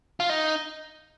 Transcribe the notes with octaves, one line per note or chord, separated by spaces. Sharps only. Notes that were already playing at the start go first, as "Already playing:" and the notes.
F4
D#4